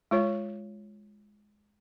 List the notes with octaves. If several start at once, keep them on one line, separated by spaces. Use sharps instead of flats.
G#3 F4 C#5